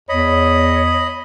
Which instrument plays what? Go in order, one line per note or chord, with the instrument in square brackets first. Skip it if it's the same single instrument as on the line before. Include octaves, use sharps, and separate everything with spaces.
[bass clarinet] E2 [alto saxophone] C#5 [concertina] D#5 B5